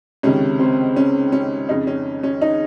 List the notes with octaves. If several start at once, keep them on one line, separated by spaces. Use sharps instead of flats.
C#2 C3 D#3 C#4
C4
C#4
C#4
F2 C#3 D#4
C#4
C#4
D#4